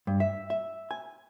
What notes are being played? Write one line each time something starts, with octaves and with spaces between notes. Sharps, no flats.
G2
E5
E5
G#5